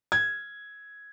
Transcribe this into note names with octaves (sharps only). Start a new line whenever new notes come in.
G#6